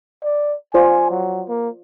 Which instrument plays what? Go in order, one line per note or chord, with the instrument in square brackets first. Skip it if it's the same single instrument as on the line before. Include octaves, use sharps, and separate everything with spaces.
[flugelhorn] D5
[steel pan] F4 C5 D5 [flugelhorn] G#5
[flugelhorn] F#3
A#3